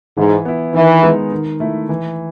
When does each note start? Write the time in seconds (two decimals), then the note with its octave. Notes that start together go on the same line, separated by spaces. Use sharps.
0.17 G#2 E3
0.45 B3 E4
0.74 D#3 E3
1.03 G#3 B3 D#4
1.32 D#3
1.60 A3 E4
1.89 E3